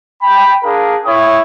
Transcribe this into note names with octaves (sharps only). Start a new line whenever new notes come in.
G5 B5
D4 G#4 A#4 F5
E4 C#5 G5 D#6